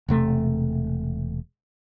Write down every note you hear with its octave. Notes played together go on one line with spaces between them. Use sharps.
E1 C3 A3